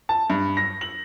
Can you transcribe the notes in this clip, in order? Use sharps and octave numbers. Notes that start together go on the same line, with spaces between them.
A5
G2
A#6
F#7